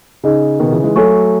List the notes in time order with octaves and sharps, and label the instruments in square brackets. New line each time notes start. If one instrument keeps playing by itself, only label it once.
[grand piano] C#3 [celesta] D#4 G#4 D#5
[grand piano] B2 D#3
C#3 E3
E3 G#3
[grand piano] F#3 A3 [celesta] F#4 A4 C#5 G#5 C#6